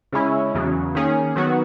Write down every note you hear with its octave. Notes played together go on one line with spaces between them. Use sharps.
C#3 G#3 C#4 E4
E2 C#3 F#3
D#3 A#3 C#4 G#4
D#3 F#3 B3 F#4